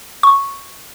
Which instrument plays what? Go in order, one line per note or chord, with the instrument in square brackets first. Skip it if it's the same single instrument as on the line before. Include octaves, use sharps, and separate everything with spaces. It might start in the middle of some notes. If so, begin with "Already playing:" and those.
[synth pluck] C#6